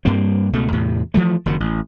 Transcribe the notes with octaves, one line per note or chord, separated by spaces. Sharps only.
G2 G3 A#3 C4
C#2 B2 A3
E2 A2 C3
E3 F3 G3 A3
F#1 D#3 F#3
A1